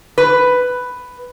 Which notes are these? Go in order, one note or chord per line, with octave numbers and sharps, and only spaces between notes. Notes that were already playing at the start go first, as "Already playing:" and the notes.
B4